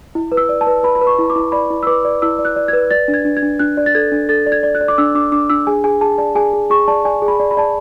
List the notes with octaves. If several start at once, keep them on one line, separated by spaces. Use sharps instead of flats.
E4
B4
E6
D5
A5
B4
B4 B5
B5
B4
C#6
E4
D6
E4
D5 B5
E4
E6
B4 D6
D5
E4 E6
D5
F#6
D5
B4 G#6
D5 A6
D4
G#6
D4
G#6
D4
D4 F#6
D5
A6
A4 G#6
D4
A4 A6
D5
G#6
D5
F#6
D5
D6
D4 E6
D4 D6
D4 D6
D4 E6
G#4 G#5
G#4 G#5
G#4 A5
D5 A5
G#4 G#5
G#4
G#4 C#6
D5 A5
D5 G#5
G#4
B5
D5
B5
D5 A5